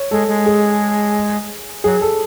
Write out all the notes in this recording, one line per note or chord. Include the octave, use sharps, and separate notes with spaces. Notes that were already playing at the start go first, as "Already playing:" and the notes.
Already playing: C#5
G#3 A4
G#3
G#4
F#3 G#4
A4